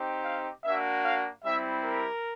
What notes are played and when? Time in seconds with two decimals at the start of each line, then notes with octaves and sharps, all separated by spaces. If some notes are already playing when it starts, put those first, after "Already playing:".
Already playing: C4 D#4 G4
0.23 F5
0.63 A#3 D4 F#4 E5
1.03 F5
1.43 G3 C4 E4 G4 E5
1.83 A#4